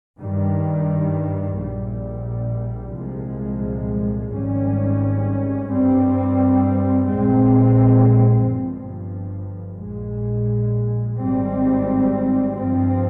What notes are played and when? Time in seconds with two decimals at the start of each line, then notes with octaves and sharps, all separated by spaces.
0.19 G2 D#3 G3
1.57 A#1 A#2 G3
2.94 C2 A#2 F3 G#3
4.31 G#1 G#2 G3 C#4
5.68 G2 G3 C4
7.07 A#1 A#2 G#3 C4
8.43 G1 G2 F3
9.81 A#1 A#2 G#3
11.18 G#1 G#2 G3 C4
12.55 G2 F3 C4